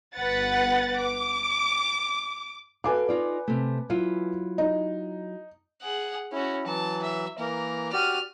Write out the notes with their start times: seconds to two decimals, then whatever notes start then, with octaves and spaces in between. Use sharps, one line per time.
0.16 G1 B4 F#5 A6
0.99 D6
2.84 F#4 A4 B4 F5 G#5 D6
3.09 D#4 F4 D5
3.48 C3 A3
3.90 F#3 E4 F4
4.58 D#4
5.82 G#4 F#5
6.32 C#4 E4 F#4
6.66 E3 F#3 A5
7.03 E5
7.39 E3 A#3 A#4
7.93 F#4 G4 D5 F6 D#7